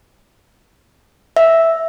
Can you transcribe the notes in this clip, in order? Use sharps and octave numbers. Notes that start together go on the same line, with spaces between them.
E5